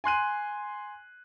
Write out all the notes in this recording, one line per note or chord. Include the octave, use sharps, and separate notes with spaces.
G#5 C6 F#6 D#7